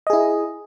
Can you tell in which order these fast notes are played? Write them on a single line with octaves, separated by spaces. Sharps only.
D#5 G#4 E4